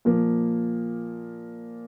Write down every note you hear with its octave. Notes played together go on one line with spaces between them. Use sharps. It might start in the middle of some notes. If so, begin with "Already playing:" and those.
A#2 F3 A#3